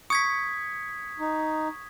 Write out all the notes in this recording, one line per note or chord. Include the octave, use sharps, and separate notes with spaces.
C#6 D#6 G#6 B6 C#7
D#4